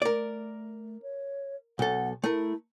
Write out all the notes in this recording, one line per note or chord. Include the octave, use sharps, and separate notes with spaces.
A3 A#4 D5
C#5
B1 A4 F#5
A3 E4 A#4